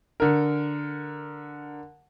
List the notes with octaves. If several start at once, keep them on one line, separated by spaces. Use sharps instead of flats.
D3 A#4